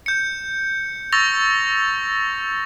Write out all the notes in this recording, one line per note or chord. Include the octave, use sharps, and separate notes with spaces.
G6 C#7
C#6 E6 A6 A#6 F7